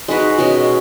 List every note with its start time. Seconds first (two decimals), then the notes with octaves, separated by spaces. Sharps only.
0.08 G#3 D#4 F#4 B4
0.38 B2 G#3 C#4